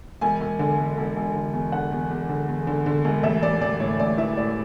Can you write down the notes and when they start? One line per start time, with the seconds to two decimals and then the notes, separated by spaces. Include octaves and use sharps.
0.21 E1 G#5
0.41 E1
0.59 D3
0.78 E1
0.98 E1
1.16 E1
1.35 D3
1.53 E2
1.72 D3 F#5
1.92 E2
2.11 E2
2.29 D3
2.49 E2
2.67 D3
2.86 D3
3.04 E1
3.23 A1 E5
3.43 A1 D5
3.61 A1 D5
3.80 A2 C#5
3.99 A1 D5
4.18 E3 E5
4.37 A2 D5